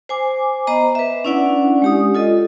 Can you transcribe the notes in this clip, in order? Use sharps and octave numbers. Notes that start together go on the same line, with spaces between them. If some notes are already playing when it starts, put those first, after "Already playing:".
C5 G#5 D6
B3 C5 D#5 A#5
B4 E5
C#4 D4 E4 D5 F#5
G#3 G4 D#6
F4 A4 D#5